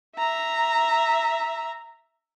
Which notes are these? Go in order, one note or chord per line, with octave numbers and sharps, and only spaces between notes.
E5 A#5